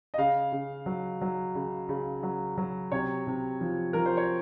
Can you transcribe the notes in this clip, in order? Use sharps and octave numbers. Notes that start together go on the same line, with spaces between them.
D#5
C#3 F5
C#3
F#3
F#3
C#3
C#3
F#3
F#3
C3 C#5
C3
F3
F3 A#4
C5
C#5